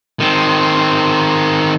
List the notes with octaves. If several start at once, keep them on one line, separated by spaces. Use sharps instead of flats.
D#3 C4